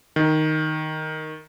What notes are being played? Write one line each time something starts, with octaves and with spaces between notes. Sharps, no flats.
D#3